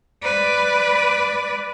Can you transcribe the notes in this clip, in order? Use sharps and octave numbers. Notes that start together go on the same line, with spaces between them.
B4 D5